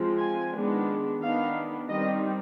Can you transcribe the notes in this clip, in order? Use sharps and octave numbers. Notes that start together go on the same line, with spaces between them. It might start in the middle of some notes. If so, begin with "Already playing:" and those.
Already playing: F3 G#3 C4
G#5
D#3 G#3 B3 D4
D#3 B3 D4 F5
D#3 G3 C4 D#5